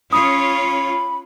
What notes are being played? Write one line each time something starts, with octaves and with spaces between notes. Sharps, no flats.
C#4 F4 C#5 B5 D#6